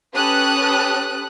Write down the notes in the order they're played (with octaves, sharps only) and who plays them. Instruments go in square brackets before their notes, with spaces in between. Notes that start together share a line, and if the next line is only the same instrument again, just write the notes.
[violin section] C#4 G4 A4 B4 D#6 F#6